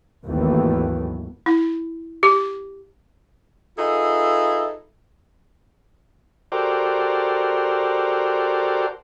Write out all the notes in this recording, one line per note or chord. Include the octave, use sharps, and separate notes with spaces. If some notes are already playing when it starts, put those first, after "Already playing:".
G#1 D#2 E3 F#3 A3 B3
E4
G4
D#4 F4 G#4 A4 B4 E5
F#4 G4 A4 A#4 C5 D5